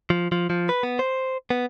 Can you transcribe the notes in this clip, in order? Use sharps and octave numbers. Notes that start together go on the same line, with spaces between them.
F3
F3
F3
B4
B3
C5
B3